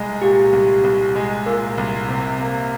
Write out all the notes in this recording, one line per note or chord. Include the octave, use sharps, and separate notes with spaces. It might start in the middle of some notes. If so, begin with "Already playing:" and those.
Already playing: C2 G#3
A#2 G4
C2
C2
G#3
A#2 A#4
C2
C3
A#3